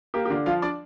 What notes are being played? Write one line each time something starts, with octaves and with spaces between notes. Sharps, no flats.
A#3 G4
G4
D3 F4
F3 F4 F5
D4 D5